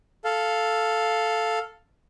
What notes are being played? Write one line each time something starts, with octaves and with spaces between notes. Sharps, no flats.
A4 F5